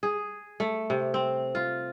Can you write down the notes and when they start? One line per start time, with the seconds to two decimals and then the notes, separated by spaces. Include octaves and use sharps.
0.03 G#4
0.60 A3
0.90 C3
1.14 C4
1.55 F4